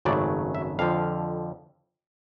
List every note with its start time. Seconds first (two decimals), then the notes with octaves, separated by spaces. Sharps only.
0.05 G#1 F#2 C#3 F#3 A3 D5
0.55 E5
0.79 F2 D3 F3 F5